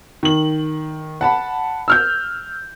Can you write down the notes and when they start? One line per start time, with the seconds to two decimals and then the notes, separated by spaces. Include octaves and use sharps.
0.23 D#3 F#7
1.21 F#5 A5 B5
1.88 E6 F6 G6